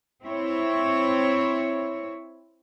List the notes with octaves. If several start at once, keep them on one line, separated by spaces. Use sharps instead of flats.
C4 E4 C#5